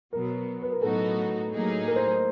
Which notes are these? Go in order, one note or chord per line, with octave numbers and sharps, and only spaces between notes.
B2 F#3 B3 A#4
B4
A#4
A2 F#3 B3 D#4 F#4 A4
A2 F#3 A#3 D#4 G#4
A#4
C5